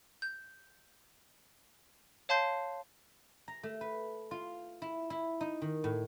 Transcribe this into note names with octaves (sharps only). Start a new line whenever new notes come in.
G6
C#5 F5 A5 C6 G6 C7
A#5
A3
B4
F4
E4
E4
D#4
D#3
A2